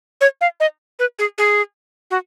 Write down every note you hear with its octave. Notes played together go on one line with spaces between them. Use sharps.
C#5
F5
D#5
B4
G#4
G#4
F#4